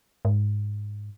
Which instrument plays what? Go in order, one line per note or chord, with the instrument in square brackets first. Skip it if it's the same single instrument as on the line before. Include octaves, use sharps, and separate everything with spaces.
[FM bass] G#2